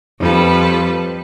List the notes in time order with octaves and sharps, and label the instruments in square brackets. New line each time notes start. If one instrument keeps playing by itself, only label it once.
[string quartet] F2 G3 A4 B4